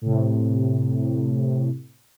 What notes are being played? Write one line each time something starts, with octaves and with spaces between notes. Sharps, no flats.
A2 C3